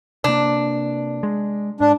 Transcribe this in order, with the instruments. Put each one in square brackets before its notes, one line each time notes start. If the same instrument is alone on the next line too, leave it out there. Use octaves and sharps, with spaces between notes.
[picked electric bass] C3 A#3 [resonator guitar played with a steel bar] D4
[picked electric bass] G#3
[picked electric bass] G#2 [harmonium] D4